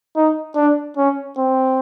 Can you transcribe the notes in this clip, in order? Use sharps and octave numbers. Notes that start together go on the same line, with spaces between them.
D#4
D4
C#4
C4